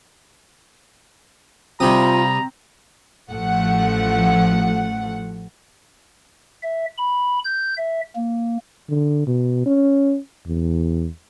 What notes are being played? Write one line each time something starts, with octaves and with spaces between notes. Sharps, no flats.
C3 G3 C4 F4 A#5 D#6
A1 F3 A3 F#5
E5
B5
G6
E5
A#3
D3
B2
C#4
E2